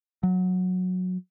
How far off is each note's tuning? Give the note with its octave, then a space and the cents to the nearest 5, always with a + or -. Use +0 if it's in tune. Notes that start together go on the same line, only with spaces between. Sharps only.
F#3 -15